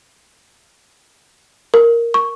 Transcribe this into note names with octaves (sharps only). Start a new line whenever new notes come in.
A#4
C#6